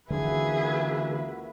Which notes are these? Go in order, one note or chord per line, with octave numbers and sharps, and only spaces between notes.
C#2 D3 E3 A#3 F#4 G#4 B4 E5